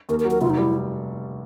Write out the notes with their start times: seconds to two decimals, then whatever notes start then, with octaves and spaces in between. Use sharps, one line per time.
0.09 D#2 A#4
0.20 A#4
0.25 F#3
0.31 A#4
0.41 F1 F4
0.50 D#4
0.57 G3 E4